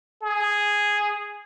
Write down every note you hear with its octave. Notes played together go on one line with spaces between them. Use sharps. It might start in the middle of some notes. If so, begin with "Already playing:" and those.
G#4